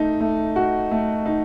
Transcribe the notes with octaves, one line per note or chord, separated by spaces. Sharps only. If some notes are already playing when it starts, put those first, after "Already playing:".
Already playing: A3 D#4
A3
F#4
A3
D#4